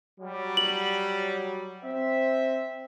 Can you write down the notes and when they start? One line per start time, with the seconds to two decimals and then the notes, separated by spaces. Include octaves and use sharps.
0.20 F#3 G3
0.57 F#7
1.84 C4 E5